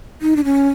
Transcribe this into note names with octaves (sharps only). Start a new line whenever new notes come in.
D#4
D4
C#4